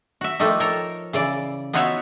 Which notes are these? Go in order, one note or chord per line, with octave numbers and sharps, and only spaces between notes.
F#4 E5
F3 G3 A3 A#3 D#4
A4 A#4 C#5
C#3 E3 D5
B3 D#4 F4 F#4 C#5 E5